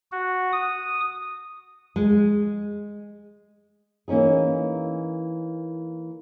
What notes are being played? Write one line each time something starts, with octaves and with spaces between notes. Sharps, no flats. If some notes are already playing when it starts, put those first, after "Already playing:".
F#4
D#6
G#3
E3 A#3 C#4 D#4 G#4